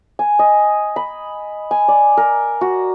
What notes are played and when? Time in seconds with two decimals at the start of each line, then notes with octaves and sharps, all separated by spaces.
0.19 G#5
0.39 D#5
0.96 B5
1.71 G#5
1.88 D5
2.17 A#4
2.61 F#4